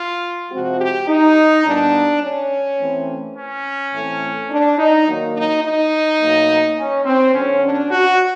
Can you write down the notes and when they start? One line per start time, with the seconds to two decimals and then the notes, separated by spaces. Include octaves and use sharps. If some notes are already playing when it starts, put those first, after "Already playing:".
Already playing: F4
0.51 C3 F3 G#3 C4 F#4
0.79 G4
1.08 D#4
1.65 A#2 G3 B3 D4
2.22 C#4
2.79 E3 A3 C4
3.36 C#4
3.93 A2 E3 A3 C4
4.50 D4
4.79 D#4
5.06 D#3 F#3 A#3
5.35 D#4
5.63 D#4
6.20 B2 F#3 A#3
6.77 C#4
7.06 C4
7.34 D3 F#3 B3 C#4
7.63 D4
7.91 F#4